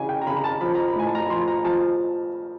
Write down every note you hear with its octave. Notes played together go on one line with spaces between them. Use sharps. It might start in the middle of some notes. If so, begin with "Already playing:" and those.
Already playing: C#3 E3 G#5
G5
A#5
C#3 B5
A#5
A5
F3 B5
A#5
B5
A2 G#5
A5
A#5
B5
F3 C6
A#5
F3 A5